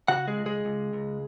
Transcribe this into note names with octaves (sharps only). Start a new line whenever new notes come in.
C#3 F#4 F#5
G#3 G#4
C#2
G#3 G#4
C#2
C#2